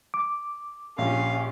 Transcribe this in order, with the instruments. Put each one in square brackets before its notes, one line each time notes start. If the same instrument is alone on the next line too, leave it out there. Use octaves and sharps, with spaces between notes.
[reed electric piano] D6
[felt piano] A#1 [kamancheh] C#4 G4 [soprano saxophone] F5